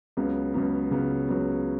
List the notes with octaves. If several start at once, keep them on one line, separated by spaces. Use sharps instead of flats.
C#2 C#3 F#3 B3
C#2 C#3 F#3 B3
C#2 C#3 F#3 B3
C#2 C#3 F#3 B3